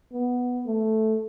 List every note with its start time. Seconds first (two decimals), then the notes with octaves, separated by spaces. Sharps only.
0.13 B3
0.66 A3